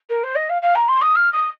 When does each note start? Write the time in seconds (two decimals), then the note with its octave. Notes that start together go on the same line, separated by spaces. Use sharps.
0.10 A#4
0.24 C5
0.36 D#5
0.50 F5
0.62 F5
0.75 A#5
0.88 C6
1.01 D#6
1.16 F6
1.33 D#6